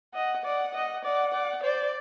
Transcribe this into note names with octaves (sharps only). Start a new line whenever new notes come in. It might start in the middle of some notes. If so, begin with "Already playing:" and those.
D#5 F#5
D5 F#5
D#5
D5 F#5
D5
C5 D5